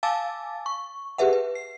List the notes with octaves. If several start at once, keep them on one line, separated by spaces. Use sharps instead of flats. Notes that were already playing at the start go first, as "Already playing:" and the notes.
F5 G#5 A5 D6 E6 A6
C#6
G4 G#4 B4 E5 F#5
B4
C7